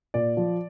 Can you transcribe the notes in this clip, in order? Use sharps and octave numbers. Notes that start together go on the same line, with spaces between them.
A#2 D5
F3